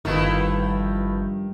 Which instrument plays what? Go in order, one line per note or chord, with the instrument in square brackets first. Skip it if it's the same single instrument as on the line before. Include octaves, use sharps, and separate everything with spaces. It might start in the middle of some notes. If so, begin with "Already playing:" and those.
[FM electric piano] G1 G6 [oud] G2 F3 [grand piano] D#3 [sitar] A3 B3 E4